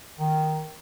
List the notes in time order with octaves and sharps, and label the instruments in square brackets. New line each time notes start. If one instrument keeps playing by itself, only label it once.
[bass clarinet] D#3